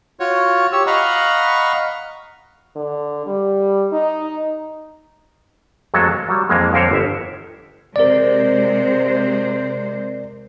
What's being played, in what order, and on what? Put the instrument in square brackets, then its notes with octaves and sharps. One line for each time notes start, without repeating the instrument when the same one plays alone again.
[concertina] F4 F#4 C#5
G4 C#5 E6
D#5 F5 F#5 A#5 B5 C#6
[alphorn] D3
G3
D#4
[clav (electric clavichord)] F2 F#3 G#3 A3 A4
A#4
F#3 G3
F2 E3 G#3 A#3
F2 D3 A#4 C5 C#5
G1 E5
[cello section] C3 G#3 C5 [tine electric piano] A#4 D5